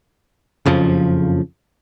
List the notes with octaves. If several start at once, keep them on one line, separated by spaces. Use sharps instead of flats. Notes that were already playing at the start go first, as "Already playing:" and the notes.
F#1 F2 C#3 F3